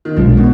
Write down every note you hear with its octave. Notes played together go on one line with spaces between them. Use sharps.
D#3
B1 B2 F3 G#3 D4
B2